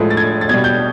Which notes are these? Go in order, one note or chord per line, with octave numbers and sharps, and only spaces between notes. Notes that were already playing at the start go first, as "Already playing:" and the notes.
Already playing: A2 F3 G#3
A6
G#6
A6
B2 G3 G#6
G6